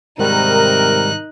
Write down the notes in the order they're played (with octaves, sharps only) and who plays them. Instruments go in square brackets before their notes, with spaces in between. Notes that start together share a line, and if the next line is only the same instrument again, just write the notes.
[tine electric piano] G#2 D#3 G3 [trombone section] C3 A#4 [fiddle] D#4 F#6